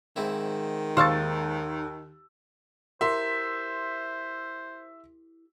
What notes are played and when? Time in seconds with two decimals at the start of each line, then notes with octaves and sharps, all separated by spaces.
0.16 G#2 D#3 C4 E4
0.97 D#2 C5 F5 C#6 E6 A6
3.01 E4 G4 A#4 C5 E5 C6